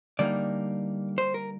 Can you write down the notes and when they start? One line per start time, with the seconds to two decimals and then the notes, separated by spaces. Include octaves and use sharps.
0.19 D3 G3 A#3 D#4 D5
1.18 C5
1.34 A#4